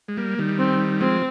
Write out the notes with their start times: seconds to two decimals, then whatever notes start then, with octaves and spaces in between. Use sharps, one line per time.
0.08 G#3
0.17 G3 A#3
0.39 D#3 G3
0.59 C4
1.00 F3 G#3 C4